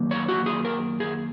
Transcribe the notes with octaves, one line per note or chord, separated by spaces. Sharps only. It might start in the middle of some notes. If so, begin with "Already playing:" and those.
Already playing: F#2 D#3 A#3
C#5
F#4
G#4
A#4
G#4